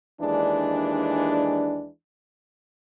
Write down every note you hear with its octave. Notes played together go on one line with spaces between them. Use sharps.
D#2 E3 G#3 D4